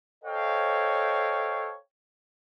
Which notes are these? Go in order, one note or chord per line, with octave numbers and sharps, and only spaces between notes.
A4 C5 C#5 D#5 F5 G5